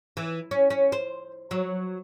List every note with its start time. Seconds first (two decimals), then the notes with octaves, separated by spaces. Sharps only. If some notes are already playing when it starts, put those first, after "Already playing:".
0.17 E3
0.51 C#4
0.70 C#4
0.92 C5
1.51 F#3